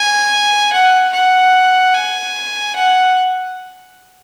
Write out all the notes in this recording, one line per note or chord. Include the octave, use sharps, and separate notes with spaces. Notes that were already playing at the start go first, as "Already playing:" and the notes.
Already playing: G#5
F#5
F#5
G#5
F#5